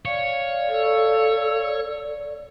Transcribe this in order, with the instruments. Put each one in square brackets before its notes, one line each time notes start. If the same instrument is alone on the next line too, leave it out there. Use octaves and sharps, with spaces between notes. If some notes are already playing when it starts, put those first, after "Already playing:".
[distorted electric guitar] C#5 [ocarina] D5 [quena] F5
[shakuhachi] A4